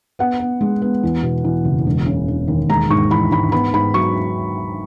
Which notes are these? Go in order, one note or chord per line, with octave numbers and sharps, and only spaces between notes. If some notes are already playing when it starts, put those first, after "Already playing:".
B3 F#5
B3
G#3
B3
E2
B2
E2
F#1
E1
C#3
E1
D#2
G#3 A#5
G#2 C#6
E3 B5
G#2 B5
B3 B5
G#2 B5
F#3 C#6